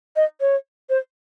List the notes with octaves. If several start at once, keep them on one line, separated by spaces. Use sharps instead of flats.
D#5
C#5
C5